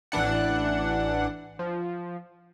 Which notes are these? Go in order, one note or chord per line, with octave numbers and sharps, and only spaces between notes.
A1 E3 D4 F#5
F3